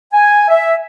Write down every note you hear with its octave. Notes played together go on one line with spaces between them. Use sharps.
G#5
E5